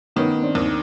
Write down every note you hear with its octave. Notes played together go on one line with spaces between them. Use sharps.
D#3 B3 C#4
C4 D4
D#2